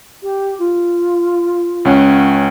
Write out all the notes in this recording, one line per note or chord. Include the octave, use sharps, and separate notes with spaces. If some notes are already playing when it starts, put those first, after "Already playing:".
G4
F4
C#2 C#4 F#5